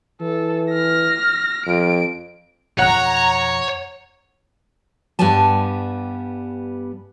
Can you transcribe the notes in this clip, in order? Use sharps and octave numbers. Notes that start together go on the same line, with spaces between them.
E3 A4
F6 A#6
F2 D7
F2 B2 C#5 F#5 A#5 F#6
G2 G3 B3 G4 G#5 A5